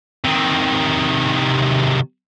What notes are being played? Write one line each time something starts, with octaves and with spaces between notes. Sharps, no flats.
C3 D#3